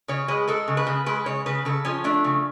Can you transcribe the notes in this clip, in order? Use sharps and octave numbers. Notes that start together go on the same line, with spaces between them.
C#3 C#5
G#3 B4
G#3 A4
C#3
B4
C#3
G#3 B4
C#3 C#5
C#3 B4
C#3 A4
F3 C#4
A3 D4
C#3